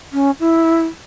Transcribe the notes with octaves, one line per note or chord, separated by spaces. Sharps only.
C#4
E4